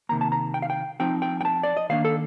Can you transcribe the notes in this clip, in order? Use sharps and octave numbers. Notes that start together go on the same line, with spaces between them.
C3 D#3 A#3 A#5
A5
A#5
G5
F5
G5
F3 C4 D#4 G5
G5
G5
A5
D5
D#5
D#3 A#3 D4 F5
A4